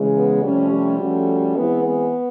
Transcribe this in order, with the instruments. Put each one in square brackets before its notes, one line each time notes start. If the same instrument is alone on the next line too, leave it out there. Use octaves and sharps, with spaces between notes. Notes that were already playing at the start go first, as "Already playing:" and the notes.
Already playing: [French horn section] C#3 E3 G#3
[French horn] B3
[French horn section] C3 F3 A3 C#4 [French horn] G3
[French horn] G3
[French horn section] F3 A3 C#4 F#4 A4
[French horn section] E3 G#3 C4 E4 G#4 [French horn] B3
[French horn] B3